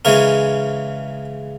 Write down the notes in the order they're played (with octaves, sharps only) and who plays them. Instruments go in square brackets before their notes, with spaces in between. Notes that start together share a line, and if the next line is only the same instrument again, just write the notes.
[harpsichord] C#3 E3 G#3 C#4 A#4 C#5